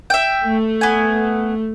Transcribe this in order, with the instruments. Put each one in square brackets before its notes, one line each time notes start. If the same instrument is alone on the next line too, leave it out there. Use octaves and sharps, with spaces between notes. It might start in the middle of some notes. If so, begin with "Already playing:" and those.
[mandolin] E5 G5
[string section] A3
[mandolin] B3 G#5